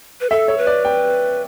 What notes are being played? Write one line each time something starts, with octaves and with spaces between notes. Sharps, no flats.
B4
A4 E5
C#5
B4
D5
G5